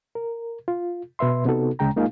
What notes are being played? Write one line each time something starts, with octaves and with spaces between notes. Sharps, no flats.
A#4
F4
B2 B4 E5 C6
C3 B3 D#4 F#4 A4
D2 C#3 G#3 G5 A#5
G#3 A#3 D#4 F4 G#4 F5